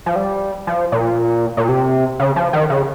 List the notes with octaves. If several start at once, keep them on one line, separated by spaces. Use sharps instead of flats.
F3
G3
F3
A#2
A#2
C3
C#3
F3
D#3
C#3